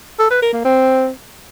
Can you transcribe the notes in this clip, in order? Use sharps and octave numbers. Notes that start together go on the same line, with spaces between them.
A4
B4
A#4
A#3
C4